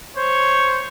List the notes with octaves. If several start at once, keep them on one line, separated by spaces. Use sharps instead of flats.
C5 C#5